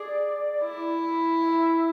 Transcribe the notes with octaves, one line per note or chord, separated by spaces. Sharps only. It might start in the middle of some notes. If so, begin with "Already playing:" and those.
Already playing: G#4 D5
E4
E5